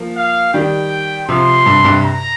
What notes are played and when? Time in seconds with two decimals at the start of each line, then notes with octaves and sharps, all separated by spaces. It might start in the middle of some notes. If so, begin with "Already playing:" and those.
Already playing: F3 A#3
0.17 F5
0.54 D#3 G3 G5
1.29 C3 F3 C6
1.66 G2 C3
1.84 G2 C3
2.03 A#5